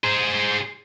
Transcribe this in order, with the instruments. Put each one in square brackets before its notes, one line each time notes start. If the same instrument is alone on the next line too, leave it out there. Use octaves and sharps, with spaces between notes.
[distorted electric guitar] G#4 C5